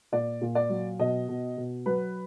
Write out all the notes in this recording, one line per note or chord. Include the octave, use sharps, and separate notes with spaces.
A#2 D5
A#2
D5
F#3
B2 D#5
B2
B2
F#3 B4